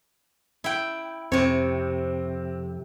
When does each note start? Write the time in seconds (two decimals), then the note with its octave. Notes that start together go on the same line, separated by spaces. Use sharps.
0.64 E4 G5
1.32 F2 C3 C4 C#5